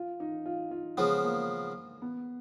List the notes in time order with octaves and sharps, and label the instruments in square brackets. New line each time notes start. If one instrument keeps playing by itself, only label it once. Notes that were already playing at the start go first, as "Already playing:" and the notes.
Already playing: [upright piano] F4
D#4
F4
F4
[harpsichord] C#3 F3 B3 [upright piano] G#3
[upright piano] A#3
B3